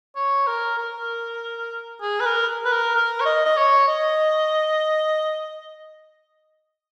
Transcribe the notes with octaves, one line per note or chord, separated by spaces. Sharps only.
C#5
A#4
A#4
G#4
B4
A#4
B4
A#4
A#4
C#5
D#5
D#5
C#5
D#5